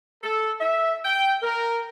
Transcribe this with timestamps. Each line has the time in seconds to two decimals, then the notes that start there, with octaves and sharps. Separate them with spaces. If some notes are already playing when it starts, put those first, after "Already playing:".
0.23 A4
0.61 E5
1.05 G5
1.42 A#4